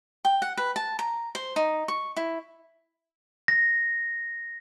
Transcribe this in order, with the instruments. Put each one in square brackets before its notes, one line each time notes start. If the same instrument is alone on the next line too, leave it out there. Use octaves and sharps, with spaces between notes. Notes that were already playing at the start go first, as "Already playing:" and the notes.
[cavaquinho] G5
F#5
B4
A5
A#5
C5
D#4
C#6
E4
[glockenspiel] A#6